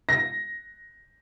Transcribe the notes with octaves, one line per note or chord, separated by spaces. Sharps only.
A#6